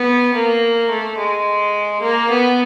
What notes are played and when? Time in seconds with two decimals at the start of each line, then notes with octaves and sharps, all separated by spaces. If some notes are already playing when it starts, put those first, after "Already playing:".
Already playing: B3
0.34 A#3
0.90 A3
1.18 G#3
2.02 A#3
2.31 B3